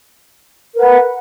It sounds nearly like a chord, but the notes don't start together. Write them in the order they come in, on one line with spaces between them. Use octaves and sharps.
A#4 B4 F#5